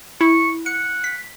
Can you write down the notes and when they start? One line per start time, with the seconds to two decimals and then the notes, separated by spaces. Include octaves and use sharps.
0.21 E4 C#6
0.66 F#5 C#7
1.04 B6